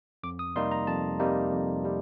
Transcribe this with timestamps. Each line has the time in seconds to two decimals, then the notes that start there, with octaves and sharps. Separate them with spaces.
0.23 F2 D6
0.39 D#6
0.56 C3 G3 A#3 D#4 C6
0.71 A#5
0.87 F2 A5
1.20 C3 G3 A#3 D#4
1.52 F2
1.84 C3 G3